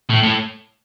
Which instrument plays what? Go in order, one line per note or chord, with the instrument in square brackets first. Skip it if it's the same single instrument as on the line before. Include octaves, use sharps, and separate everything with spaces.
[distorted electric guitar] A2
A2